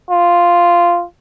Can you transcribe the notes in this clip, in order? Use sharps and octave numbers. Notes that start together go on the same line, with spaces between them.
F4